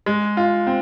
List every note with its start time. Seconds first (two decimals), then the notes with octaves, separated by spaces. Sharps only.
0.06 G#3
0.37 F4
0.67 C4